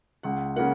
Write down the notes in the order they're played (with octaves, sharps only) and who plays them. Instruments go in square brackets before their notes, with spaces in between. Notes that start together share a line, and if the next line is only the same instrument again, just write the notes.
[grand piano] C#2 F#5
C#3 A#3 F#5